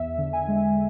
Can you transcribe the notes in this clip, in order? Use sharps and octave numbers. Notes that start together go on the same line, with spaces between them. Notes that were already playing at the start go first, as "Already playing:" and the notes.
Already playing: E2 E5
D3
G#5
G#3